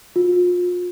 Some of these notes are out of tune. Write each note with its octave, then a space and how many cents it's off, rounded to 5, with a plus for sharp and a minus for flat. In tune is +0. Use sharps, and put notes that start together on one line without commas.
F4 +35